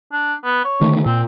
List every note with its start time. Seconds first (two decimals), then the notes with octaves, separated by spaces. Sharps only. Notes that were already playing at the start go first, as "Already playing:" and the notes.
0.12 D4
0.44 B3
0.65 C#5
0.81 D3 D#3 A3
1.06 A#2 C4